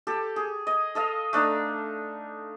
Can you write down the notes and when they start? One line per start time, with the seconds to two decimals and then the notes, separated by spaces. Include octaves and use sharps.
0.07 G4 A4
0.36 G#4
0.67 D#5
0.95 A4 D#5 F5
1.33 A3 D4 D#4